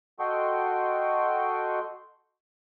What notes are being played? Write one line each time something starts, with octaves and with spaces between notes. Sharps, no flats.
F#4 A4 D#5 G5 C6 C#6